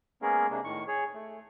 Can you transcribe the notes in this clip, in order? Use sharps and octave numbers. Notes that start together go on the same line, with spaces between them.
G#3 A#3 B3 C#4 G#4 A#4
C3 G#3 A#3 D4
A2 D#3 C#6
G#4 C#5
A3